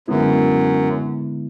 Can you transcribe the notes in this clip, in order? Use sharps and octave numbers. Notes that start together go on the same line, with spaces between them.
F#2 D3 G#3 B3 E4